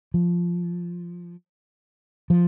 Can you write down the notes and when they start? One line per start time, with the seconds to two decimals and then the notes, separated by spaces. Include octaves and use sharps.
0.14 F3
2.30 F3